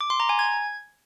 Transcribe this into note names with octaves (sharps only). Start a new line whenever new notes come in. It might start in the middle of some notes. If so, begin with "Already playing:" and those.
D6
C6
A#5
G#5
G#6